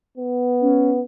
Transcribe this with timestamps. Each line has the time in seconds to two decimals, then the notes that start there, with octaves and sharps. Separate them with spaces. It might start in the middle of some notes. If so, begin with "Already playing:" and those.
0.17 B3
0.61 C#4